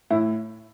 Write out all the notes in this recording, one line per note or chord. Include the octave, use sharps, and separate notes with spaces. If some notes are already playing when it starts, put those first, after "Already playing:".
A2 E4